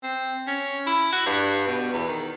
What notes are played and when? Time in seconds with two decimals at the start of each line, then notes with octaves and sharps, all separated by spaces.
0.03 C4
0.47 C#4
0.87 E4
1.12 F#4
1.26 G2
1.67 B2
1.93 E2
2.08 D#3